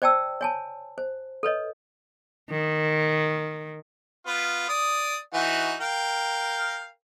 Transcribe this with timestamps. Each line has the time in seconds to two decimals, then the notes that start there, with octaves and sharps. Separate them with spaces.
0.02 C5 D5 G5 A5 E6
0.41 C#5 G#5 A5
0.98 C5
1.43 A4 B4 C#5 D#5
2.50 D#3
4.27 B3 F4
4.69 D5 D#6
5.34 E3 D#4 F#4
5.81 A#4 F5 G5